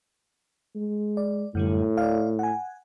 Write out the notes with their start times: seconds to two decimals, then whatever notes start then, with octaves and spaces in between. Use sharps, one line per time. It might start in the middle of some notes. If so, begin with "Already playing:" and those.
0.75 G#3
1.17 D5
1.55 F#2 A2 D3 G3
1.97 D5 F5
2.39 F#5 G#5